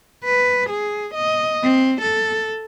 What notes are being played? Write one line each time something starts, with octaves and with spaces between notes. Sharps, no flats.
B4
G#4
D#5
C4
A4